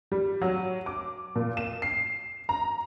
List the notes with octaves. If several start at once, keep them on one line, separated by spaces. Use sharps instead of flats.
G3
F#3
D6
A#2
E7
C7
A#5